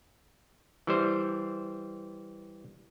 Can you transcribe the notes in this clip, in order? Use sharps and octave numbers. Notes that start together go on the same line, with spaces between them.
E3 G3 C5